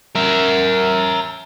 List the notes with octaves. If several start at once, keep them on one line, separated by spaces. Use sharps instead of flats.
A#4 E5